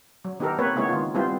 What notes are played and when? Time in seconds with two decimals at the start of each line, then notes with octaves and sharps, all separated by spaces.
0.25 F#3
0.39 D#3 B3 D#4 G4 A4 A#4
0.59 A#3 C4 B4 C#5
0.76 C#3 G#3 A#3 B3 E4 C#5
0.89 D#3 F4
1.15 G3 B3 C4 E4 F4 C5